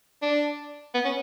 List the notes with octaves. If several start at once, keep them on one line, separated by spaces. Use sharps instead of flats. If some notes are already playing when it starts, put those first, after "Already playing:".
D4
B3
C#4